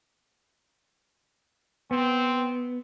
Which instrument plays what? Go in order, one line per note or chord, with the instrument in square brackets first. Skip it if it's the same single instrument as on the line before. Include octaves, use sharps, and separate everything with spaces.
[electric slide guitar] B3 [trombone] C4